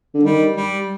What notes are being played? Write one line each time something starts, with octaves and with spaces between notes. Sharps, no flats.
D3
D#3 G3
G3